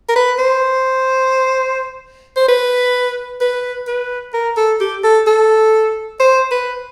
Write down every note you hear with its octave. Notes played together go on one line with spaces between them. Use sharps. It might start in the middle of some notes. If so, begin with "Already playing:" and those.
A#4
B4
C5
C5
B4
B4
B4
A#4
A4
G4
A4
A4
C5
B4